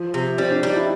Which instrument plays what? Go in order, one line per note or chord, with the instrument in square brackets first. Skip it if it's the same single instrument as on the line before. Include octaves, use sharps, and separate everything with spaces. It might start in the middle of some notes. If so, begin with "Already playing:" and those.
Already playing: [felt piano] F3
[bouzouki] C3
[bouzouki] G3 [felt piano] C4
[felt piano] D4
[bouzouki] G3 [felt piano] D#4
[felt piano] E4